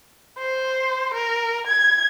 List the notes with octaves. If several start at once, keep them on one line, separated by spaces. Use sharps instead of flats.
C5
A#4
G#6